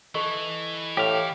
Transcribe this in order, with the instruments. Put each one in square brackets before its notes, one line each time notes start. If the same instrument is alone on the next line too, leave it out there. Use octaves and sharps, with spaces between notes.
[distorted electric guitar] E3 [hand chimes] A4 D#5 C#6
[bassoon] A2 [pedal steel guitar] G4 F5